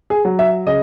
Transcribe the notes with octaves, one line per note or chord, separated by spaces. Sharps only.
G#4
F#3
E5
C#3 D#5